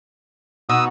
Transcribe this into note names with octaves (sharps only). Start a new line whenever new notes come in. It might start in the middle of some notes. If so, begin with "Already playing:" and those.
B2 D#4 F#4 D#6 E6